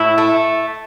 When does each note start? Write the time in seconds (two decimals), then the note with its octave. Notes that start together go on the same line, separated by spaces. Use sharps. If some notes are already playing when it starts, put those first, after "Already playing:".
Already playing: A2 E4
0.18 A3